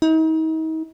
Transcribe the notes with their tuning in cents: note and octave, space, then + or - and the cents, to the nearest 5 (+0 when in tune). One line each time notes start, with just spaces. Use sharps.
D#4 +40